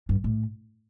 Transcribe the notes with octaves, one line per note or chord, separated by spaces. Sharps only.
G2
A2